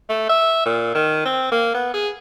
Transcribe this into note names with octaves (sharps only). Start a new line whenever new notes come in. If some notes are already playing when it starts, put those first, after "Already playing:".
A3
E5
A#2
D#3
C4
A#3
B3
G#4